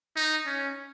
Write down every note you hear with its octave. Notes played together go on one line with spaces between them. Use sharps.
D#4
C#4